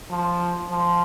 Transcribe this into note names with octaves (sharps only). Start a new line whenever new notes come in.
F3
F3